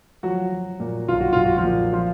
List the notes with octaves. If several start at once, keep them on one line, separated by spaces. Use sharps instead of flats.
F3 F#3 F#4
F3
A#2
B1 F4
F#4
B1 F4
F#4
F3 F4
A#2
F3 F4